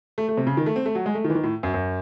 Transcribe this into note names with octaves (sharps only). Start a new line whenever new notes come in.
A3
A3
C3
C#3
D#3
A3
C4
A3
F#3
G#3
A3
D#3
E3
D#3
A2
F#2
F#2